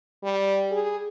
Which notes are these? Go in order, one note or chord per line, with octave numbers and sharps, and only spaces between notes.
G3
G#4